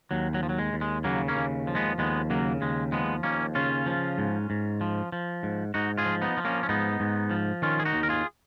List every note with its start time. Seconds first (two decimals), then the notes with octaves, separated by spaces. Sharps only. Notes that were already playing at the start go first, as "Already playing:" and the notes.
0.11 D#2 F#3
0.34 F#3
0.43 F3
0.49 F#3
0.59 G#3
0.73 D#2
0.81 G#3
1.04 C#3 F#3 A#3
1.28 A#3 C#4
1.36 D#2
1.67 F3
1.75 G#3 B3
1.99 D#2 G#3 B3
2.30 C#3 F#3 A#3
2.61 D#2 G#3
2.92 F3 G#3 B3
3.23 D#2 A#3 C#4
3.55 C#3 C#4 F4
3.86 F3
4.18 G#2
4.50 G#2
4.81 F3
5.12 F3
5.43 G#2
5.74 G#2 D#4 F#4
5.97 F4 G#4
6.05 F3
6.22 B3 D#4
6.37 F3
6.45 A#3 C#4
6.63 C#4
6.69 G#2 B3 D#4
7.00 G#2
7.31 F3
7.62 D#3 C#4 F4
7.80 G#4
7.85 D#4 F#4
7.93 D#2
8.03 A#4
8.09 F4 G#4